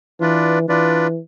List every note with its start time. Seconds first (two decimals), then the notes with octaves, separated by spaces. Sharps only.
0.20 E3 D4 F4 B4 D5
0.68 E3 D4 F4 B4 D5